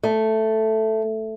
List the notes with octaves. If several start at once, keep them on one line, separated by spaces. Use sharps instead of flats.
A3